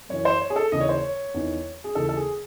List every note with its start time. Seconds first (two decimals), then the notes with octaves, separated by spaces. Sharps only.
0.09 F#2 E3 C#5
0.25 C5
0.41 C#5
0.50 G#4
0.56 A4
0.72 D#2 C#3 E3 D#5
0.81 C#5
0.89 C5
0.98 C#5
1.34 E2 D#3
1.84 G#4
1.95 D#2 C#3 E3 A4
2.09 A4
2.16 G#4